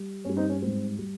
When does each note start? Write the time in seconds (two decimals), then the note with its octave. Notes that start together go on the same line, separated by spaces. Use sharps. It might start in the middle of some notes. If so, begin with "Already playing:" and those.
Already playing: G3
0.25 G2 G3 C#4
0.37 C4 D#4
0.49 C#4
0.62 G#2 G3 C4
0.99 G3